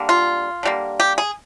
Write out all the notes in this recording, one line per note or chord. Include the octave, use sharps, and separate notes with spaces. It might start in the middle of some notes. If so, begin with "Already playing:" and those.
Already playing: D3 G3 A#3
F4
D3 G3 A#3
G4
G#4